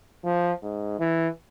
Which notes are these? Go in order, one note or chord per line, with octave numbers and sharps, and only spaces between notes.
F3
G#2
E3